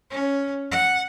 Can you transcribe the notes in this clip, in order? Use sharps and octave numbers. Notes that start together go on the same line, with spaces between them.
C#4
F#5